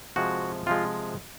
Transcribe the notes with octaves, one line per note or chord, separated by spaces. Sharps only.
C3 F3 G#3 F#4
C3 F3 G#3 F4